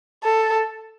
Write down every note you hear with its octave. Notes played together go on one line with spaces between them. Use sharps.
A4